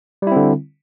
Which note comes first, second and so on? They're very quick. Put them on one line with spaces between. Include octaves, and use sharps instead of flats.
G3 E4 C4 D3